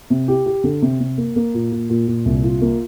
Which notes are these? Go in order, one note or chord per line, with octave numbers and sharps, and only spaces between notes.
C3
G4
G4
D3
C3
C3
A#3
A#3
A#2
A#2
A#2
A#2
C2
F4
A#3